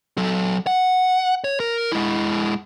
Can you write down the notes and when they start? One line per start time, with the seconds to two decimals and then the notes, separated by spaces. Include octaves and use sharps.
0.17 F#3 A4
0.67 F#5
1.44 C#5
1.60 A#4
1.92 G#3 E4